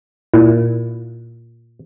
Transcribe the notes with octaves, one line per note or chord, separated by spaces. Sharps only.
A#2 E4